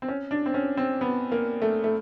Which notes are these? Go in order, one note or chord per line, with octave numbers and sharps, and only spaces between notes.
C4
C#4
D4
C4
C#4
C4
B3
A#3
A3
A3